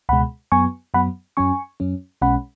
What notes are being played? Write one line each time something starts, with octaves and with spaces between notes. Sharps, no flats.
C#2 B2 G#3 F#5 B5
F#2 F#3 B3 G#5 C#6
F#2 F#3 B3 F#5 B5
F#2 F#3 C#4 G#5 C#6
F#2 F#3 C#4
B1 B2 G#3 C#4 F#5 B5